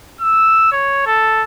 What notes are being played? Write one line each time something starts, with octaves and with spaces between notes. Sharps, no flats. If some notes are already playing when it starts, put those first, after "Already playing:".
E6
C#5
A4